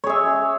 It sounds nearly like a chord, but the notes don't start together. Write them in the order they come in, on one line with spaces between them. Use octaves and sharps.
C#5 G#4 E5